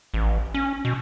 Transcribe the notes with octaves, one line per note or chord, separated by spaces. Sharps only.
A1
C#4
B2